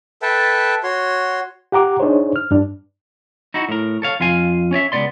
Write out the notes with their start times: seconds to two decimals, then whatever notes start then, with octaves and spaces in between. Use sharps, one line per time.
0.22 A4 B4 E5 G5 A5
0.83 F#4 C#5 C6
1.72 G4 F#5 A#5 D6
2.00 D4 D#4 G#4 C5 C#5
2.36 F6
2.51 G2 D4
3.54 D#4 E4 F#4
3.69 A2 A#4
4.02 A4 C#5 F5
4.20 F2 F4 F5 G#5
4.71 C#4 C#5 D5 E5
4.92 C#2 F#3 B3 D5 C6